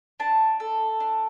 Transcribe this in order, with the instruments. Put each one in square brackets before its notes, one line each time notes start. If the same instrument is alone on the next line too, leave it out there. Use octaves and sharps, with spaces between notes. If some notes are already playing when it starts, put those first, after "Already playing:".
[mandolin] D4 A5
A4
D4